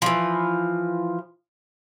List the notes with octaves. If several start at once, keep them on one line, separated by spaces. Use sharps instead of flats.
E3 F3